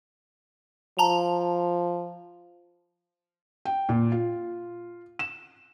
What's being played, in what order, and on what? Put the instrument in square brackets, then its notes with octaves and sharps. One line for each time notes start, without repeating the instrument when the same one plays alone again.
[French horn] F3 [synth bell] A5 A#5 F7
[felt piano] G5
A#2
F4
E7